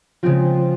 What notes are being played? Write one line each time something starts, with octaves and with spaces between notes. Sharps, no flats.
C#3 F3 G#3 C4 F4